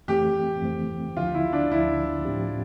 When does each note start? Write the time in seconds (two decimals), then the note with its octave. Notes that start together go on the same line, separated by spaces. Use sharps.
0.08 F2 E3 A3 C4 G4
0.62 F2 E3 A3 C4
1.16 D2 D3 F3 F4
1.34 E4
1.53 D4
1.71 D2 D3 F3 E4
2.25 A2 F3 C4 G4